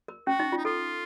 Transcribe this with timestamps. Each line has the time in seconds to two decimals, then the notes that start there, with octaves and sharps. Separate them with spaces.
0.08 A#4
0.27 C#4 F#4
0.40 D#4
0.52 F4
0.58 D#4
0.65 F4 A4